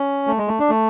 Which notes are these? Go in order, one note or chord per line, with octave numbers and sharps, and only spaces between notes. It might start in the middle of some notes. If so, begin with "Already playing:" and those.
Already playing: C#4
A3
G#3
A3
D4
A3